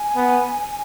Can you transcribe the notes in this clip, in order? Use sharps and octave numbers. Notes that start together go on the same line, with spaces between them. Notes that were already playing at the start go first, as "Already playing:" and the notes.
Already playing: G#5
B3